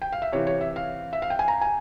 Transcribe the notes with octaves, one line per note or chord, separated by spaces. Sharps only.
G5
F5
E5
C3 E3 C#5
C#5
E5
F5
E5
F5
G5
G#5
A#5
G#5